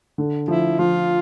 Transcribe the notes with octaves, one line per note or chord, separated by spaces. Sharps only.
D3
F3 E4
F3 F4